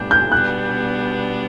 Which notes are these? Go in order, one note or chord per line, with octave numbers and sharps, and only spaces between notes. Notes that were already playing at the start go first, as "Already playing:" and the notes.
Already playing: A2 G3 B3 D4 G6
G6
B2 G3 B3 D4 F#6